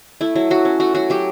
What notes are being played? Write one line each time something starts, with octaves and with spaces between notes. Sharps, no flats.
A3 E4
F#3 E4
F#3 F#4
C#4
A3 F#4
F#3 F#4
F#3 G4